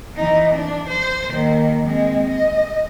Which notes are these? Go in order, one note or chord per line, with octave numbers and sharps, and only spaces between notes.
E3 D#4
D4
C5
D#2 D#3
G#3 C4
D#5